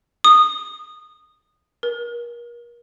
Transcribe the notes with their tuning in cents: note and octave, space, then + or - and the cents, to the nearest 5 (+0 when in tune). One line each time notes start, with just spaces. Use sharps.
D#6 -15
A#4 +35